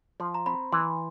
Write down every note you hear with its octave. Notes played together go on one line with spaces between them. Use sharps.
F3 C6
A#5
C4 B5
E3 C6